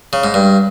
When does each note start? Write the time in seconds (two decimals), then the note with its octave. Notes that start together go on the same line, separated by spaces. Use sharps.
0.13 C#3
0.24 G#2
0.34 G2